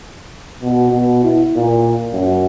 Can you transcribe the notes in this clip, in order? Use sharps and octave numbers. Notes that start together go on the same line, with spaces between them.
B2
B2
E4
A#2
F#2